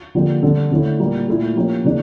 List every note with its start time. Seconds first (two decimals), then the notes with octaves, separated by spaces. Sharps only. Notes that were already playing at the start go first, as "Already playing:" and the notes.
0.15 D3 F3 A#3 D4 G4
0.43 D3 G3 D4 A4
0.71 D3 A3 C#4 E4
0.99 A#2 G3 A#3
1.28 A#2 A3 E4 A4
1.55 F3 A#3 C#4 G4
1.84 C#3 E3 A#3 D4